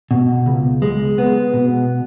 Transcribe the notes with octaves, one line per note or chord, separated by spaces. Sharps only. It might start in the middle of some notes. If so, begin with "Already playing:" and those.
B2
C#2
G#3
B3
B2